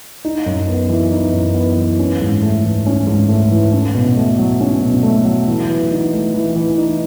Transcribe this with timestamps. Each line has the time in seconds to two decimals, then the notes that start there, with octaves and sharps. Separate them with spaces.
0.25 D#4
0.46 F#2
0.68 B3
0.89 E3
1.12 D#4
1.33 F#2
1.54 B3
1.77 E3
1.99 C#4
2.21 G#2
2.42 A3
2.65 E3
2.86 C#4
3.07 G#2
3.29 A3
3.51 E3
3.72 C#4
3.95 B2
4.16 A3
4.38 F#3
4.61 C#4
4.82 B2
5.03 A3
5.25 F#3
5.47 E3
5.69 E3
5.91 D#4
6.13 A3
6.34 E3
6.56 E3
6.78 D#4